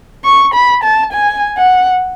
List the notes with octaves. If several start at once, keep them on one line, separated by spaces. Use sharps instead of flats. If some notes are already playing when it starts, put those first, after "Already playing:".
C#6
B5
A5
G#5
F#5